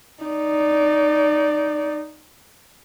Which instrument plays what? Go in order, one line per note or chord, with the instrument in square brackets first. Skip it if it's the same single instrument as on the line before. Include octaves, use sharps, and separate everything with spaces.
[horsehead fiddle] D#4 D5